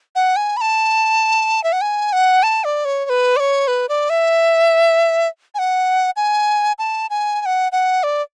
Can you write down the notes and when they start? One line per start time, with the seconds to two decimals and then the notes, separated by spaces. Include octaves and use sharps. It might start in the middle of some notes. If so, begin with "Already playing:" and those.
0.16 F#5
0.36 G#5
0.57 B5
0.61 A5
1.64 E5
1.72 F#5
1.81 G#5
2.13 F#5
2.43 A5
2.64 D5
2.85 C#5
3.06 C#5
3.10 B4
3.37 D5
3.40 C#5
3.68 B4
3.89 D5
4.10 E5
5.55 G#5
5.59 F#5
6.16 G#5
6.79 A5
7.10 G#5
7.41 G#5
7.46 F#5
7.72 F#5
8.03 D5